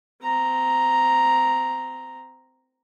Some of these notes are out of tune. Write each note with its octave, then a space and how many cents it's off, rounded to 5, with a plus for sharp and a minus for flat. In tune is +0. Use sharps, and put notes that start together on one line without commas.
C4 -20 A#5 +0